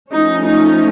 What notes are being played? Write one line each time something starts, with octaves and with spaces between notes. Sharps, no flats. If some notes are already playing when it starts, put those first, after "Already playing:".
F3 A3 C#4 D#4
D#4